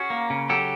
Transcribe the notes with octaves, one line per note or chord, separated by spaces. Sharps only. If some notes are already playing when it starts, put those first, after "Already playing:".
Already playing: C#4 F#4 G#4
A#3
C#3
F#3 G4 A4